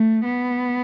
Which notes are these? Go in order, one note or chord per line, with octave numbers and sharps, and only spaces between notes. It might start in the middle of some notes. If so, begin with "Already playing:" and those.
Already playing: A3
B3